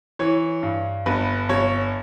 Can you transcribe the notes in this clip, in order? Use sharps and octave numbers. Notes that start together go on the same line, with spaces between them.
E3 C#5
G2
G1 B4
G1 C#5